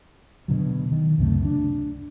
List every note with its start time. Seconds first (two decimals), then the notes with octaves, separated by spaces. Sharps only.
0.48 B2 D3 F#3
0.92 D#3
1.18 C#2 F#2 C3 A3
1.45 D4